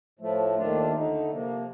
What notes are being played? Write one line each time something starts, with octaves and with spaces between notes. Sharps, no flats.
A2 F3 A3
D#2 D#3 A3 D4 F4
D3 A3 D#4
C3 F3 A#3